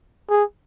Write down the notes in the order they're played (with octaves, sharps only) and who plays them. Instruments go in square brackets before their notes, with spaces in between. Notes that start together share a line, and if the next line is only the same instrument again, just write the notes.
[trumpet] G#4